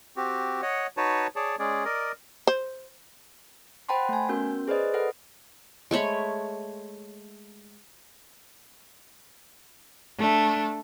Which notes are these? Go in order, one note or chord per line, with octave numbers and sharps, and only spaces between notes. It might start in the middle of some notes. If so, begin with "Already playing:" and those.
C4 F#4 G4
C#5 D#5 F#5
D#4 F#4 B4 C#5 A5
G#4 C#5 D5 A5
G#3 C#4 G#4 D5
A#4 D5 D#5
C5
C5 F#5 G5 A5 B5 C6
A3 G#5
B3 C#4 F#4 A#4 G6
G#4 B4 C5 D5 D#5
A4 B4 F#5
G#3 A3 C#5 B5
A3 D4